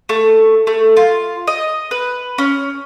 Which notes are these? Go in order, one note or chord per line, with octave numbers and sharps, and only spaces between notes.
A3
A3
F4
D#5
B4
C#4